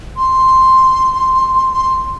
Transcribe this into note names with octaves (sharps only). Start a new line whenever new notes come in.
C6
C6